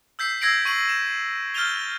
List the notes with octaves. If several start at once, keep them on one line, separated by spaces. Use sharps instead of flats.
E6 G6 B6 C7
E6 G#6 A#6 C7 D7 F#7
C#6 D#7 F#7
E7
F6 G6 A6 D#7 F7 G7